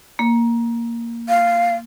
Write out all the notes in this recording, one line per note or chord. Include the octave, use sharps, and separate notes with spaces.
A#3
F5